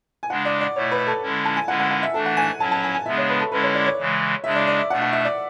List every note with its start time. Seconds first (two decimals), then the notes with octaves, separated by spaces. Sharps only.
0.23 G#5
0.30 C#3 G#3 D4 F#5
0.45 D5
0.61 D5
0.75 B2 A3 E4 C#5
0.91 B4
1.07 A4
1.23 D3 G#3 C#4 E4
1.45 A5
1.57 G#5
1.68 D3 G#3 C#4 E4 F#5
1.79 F#5
1.91 F#5
2.03 E5
2.14 E3 A3 D4 A4
2.26 F#5
2.37 G#5
2.59 F#3 C#4 E4 A5
2.71 A5
2.83 G#5
2.94 G#5
3.06 C#3 G#3 B3 D4 E5
3.18 C#5
3.29 B4
3.40 A4
3.52 D3 G#3 C#4 E4 B4
3.63 C#5
3.75 D5
3.86 C#5
3.98 C#3 E3 G#3
4.44 C#3 G#3 D4 E5
4.56 D5
4.67 D5
4.79 E5
4.90 B2 A3 D4 F#5
5.02 F#5
5.13 E5
5.25 D5